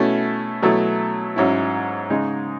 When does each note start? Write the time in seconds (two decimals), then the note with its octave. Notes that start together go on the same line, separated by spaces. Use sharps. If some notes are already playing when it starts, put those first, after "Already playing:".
Already playing: B2 A3 C#4 E4
0.62 B2 F#3 A3 E4
1.36 G#2 F#3 C#4 E4
2.10 C#3 G#3 D#4